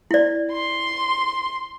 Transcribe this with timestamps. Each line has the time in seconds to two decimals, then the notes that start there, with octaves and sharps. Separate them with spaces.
0.11 E4 D5
0.52 C6